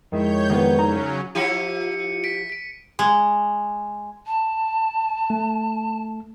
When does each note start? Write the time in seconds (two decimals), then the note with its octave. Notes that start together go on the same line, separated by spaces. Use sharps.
0.12 F2 D#3 G#3 E4 C#5 G6
0.50 C2 D#3 A#3 B3
0.79 C#3 F#3 C#4 D#4 A#5
1.35 F3 E4 G4 C#7 D#7
2.24 B6 D7
2.50 B6 D7
2.99 G#3
4.27 A5
5.30 A3